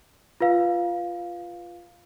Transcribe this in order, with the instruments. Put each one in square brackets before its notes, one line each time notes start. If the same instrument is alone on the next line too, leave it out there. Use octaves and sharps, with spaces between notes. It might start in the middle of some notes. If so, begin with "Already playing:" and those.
[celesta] F4 B4 F5